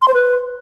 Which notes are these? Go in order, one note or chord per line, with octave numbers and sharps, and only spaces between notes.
C6
C5
B4